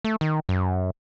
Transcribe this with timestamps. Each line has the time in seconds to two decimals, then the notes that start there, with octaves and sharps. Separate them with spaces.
0.05 A3
0.21 D#3
0.49 F#2